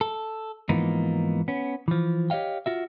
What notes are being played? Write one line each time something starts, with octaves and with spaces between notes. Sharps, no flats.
A4
G#2 E3 F3 A#3 B3 D#4
B3 C#4
E3 F3
G4 C#5 D#5 F5 G5
F4 F#4 E5